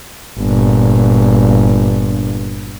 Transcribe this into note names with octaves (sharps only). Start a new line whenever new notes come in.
G1 A#2